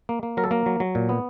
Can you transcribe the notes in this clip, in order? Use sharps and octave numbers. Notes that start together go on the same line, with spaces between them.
A#3
A#3
F#3 A#4
A4
A#3 A#4
F#3
F#3
A#2
B3